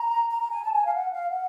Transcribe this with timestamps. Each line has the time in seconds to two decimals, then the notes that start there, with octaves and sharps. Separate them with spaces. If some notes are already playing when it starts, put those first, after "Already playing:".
Already playing: A#5
0.29 A#5
0.40 A#5
0.50 G#5
0.62 A5
0.72 G#5
0.84 F5
0.94 F#5
1.12 F5
1.29 F#5